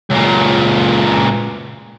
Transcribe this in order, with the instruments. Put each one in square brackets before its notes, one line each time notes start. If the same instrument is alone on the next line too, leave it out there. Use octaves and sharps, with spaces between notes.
[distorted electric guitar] C#2 A#2